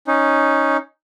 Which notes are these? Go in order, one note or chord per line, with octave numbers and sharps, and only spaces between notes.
C#4 D#4